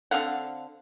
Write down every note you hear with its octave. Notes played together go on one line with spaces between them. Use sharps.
D3 C4 F5 F#5